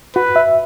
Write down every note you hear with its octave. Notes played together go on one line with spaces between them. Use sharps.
F#4 B4
E5